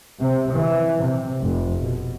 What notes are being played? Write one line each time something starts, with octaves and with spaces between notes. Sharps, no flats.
C3
E3
C3
F1
B2